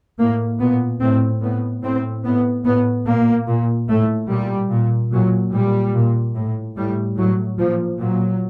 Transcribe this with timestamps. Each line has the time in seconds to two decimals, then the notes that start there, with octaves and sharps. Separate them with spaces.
0.19 A2 A#3
0.60 A#2 B3
1.01 A2 C4
1.42 A2 B3
1.83 A2 C4
2.24 A2 B3
2.65 A2 B3
3.07 A#2 A#3
3.47 A#2
3.89 A2 A3
4.30 A#2 G3
4.71 A#2
5.12 A#2 F#3
5.53 A#2 G3
5.95 A#2
6.35 A2
6.76 A2 G3
7.18 A2 F#3
7.58 A#2 F3
7.99 A#2 F#3